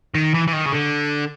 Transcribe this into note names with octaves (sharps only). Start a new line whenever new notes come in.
D#3
E3
E3
D#3
C#3
D3